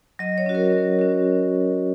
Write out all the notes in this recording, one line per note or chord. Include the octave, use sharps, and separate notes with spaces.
F#3 D#5
C#5
C#4 F#4
A#4
F#3
C#4 F#4